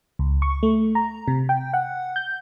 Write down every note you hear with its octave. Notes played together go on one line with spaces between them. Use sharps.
C#2
C#6
A3
A#5
C3
G5
F#5
G6